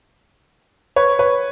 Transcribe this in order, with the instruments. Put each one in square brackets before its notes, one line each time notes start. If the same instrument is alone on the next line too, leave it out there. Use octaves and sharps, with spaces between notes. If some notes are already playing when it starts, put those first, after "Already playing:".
[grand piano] B4 C#5
B4 C#5